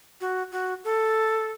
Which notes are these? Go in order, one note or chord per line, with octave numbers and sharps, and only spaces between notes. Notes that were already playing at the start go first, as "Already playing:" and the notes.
F#4
F#4
A4